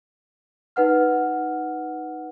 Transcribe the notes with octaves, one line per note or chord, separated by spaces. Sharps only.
D#4 B4 F#5 F6